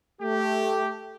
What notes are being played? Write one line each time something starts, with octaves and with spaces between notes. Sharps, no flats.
A3 G4